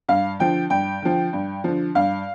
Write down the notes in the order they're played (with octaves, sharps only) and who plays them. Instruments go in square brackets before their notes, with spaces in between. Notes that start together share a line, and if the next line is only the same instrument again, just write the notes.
[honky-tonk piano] G2 F5
D3 F3 G5
G2 G5
D3 F3
G2
D3 F3
G2 F5